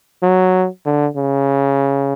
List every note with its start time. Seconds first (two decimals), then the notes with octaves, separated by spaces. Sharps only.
0.23 F#3
0.86 D3
1.16 C#3